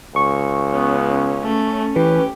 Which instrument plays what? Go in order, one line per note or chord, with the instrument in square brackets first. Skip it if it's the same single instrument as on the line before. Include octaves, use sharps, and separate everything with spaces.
[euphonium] C#2 [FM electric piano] C#6
[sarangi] B3 [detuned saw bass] C#4
[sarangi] A3
[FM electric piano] E3 [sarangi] G4 [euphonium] B4